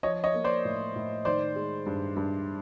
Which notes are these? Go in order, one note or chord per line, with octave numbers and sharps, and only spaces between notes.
F3 C#5 D#5
C#5 D#5
A#3
C5 D5
A2
A2
D#3 C5 D5
G#3
G2
G2